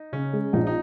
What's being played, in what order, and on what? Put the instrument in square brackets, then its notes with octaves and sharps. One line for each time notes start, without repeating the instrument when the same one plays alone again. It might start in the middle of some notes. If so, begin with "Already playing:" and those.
Already playing: [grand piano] D#4
[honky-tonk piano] C#3 [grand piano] C#4
[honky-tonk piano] G#3
[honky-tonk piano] A#1 [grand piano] D#4
[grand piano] D#4